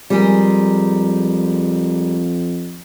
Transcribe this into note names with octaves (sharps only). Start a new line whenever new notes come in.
F2 G3 G#3 A#4